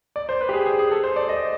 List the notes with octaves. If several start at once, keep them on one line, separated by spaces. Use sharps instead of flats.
D5
C5
B4
G4
G#4
G#4
G#4
A4
C5
D5
D#5